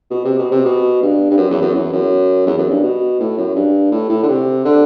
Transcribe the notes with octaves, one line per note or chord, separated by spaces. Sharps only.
B2
C3
B2
C3
B2
G2
G2
F#2
E2
F#2
E2
F#2
E2
F#2
G2
B2
A2
F#2
G2
A2
A2
D3
C3
D3